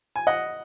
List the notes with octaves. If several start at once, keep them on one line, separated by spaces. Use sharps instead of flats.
G#5
D#5 F#5